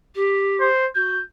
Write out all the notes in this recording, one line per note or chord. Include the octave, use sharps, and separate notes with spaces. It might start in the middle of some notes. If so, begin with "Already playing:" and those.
G4
C5
F#4 G6